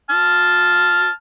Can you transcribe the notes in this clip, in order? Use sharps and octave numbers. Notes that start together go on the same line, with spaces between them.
A5 F6